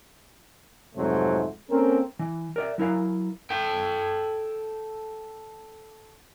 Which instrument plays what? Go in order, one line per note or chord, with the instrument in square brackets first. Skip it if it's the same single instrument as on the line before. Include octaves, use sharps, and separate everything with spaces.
[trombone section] F2 G#2 C3 F#3 A3 C5
A#3 C4 C#4 A4 A#4
[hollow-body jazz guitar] E3
A#4 D5 E5
F#3 E4 A#4 F5
[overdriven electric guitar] A4 G5